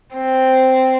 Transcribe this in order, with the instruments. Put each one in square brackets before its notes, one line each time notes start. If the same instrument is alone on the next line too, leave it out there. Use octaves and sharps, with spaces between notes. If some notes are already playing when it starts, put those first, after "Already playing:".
[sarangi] C4